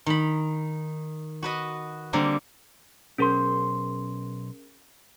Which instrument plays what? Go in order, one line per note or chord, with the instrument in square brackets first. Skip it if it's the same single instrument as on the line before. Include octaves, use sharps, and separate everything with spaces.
[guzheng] D#3 B5
F#4 B4 D#5
D3 G3 A#3 C4
[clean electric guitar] B1 C5 C6 [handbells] C#4 G#4 A#4